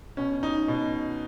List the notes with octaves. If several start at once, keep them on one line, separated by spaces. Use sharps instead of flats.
B2 C#4
D#4
B2